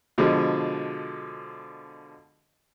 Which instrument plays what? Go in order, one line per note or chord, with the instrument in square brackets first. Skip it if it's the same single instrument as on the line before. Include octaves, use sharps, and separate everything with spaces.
[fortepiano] B2 D3 F3 G#3